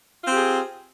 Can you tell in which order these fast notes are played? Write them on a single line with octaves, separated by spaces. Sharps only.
F4 C4 G4 G#4